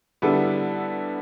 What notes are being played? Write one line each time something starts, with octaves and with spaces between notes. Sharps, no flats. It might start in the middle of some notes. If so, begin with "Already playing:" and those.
D3 G3 B3 E4 A4